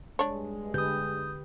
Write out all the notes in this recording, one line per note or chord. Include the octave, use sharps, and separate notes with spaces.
G2 G#3 D4 C#5
D3 G4 B4 D#6 G6